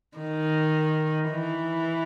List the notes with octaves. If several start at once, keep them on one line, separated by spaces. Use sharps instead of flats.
D#3
E3